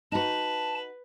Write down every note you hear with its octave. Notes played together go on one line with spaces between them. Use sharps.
D#4 F#4 B4 A5